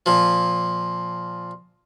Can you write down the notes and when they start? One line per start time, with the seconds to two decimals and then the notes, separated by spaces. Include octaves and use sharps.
0.06 A#2 F3